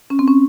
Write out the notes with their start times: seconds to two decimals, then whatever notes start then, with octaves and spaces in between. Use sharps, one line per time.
0.10 C#4
0.19 C4
0.28 C#4